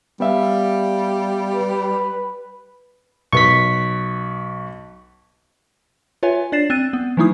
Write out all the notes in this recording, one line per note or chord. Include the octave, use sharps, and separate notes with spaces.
G3 B3 E5 F5
B4
B1 B4 C#6 B6
F4 B4 C#5 E5 G#5
D4 D5 A6 C7 E7
C4 F#6 A6 D#7
B3
E3 F#3 A3 D#4 E4 D#6